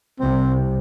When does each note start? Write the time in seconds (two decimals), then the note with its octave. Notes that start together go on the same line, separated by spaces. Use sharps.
0.19 C2 C3 C4